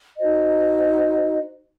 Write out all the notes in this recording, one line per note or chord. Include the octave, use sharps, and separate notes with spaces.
D#4 F#4 C5 D#5